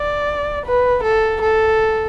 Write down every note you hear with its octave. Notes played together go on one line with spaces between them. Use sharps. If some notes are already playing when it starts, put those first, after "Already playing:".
Already playing: D5
B4
A4
A4